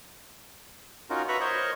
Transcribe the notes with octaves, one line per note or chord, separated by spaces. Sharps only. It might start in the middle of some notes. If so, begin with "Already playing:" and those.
C#4 D#4 F4 F#4 A#4
F#4 B4 E5 A#5 C#6 F#6
A#4 C5 C#5 D#5